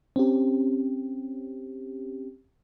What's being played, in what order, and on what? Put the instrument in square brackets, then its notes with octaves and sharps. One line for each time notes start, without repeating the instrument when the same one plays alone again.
[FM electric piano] C4 C#4 G4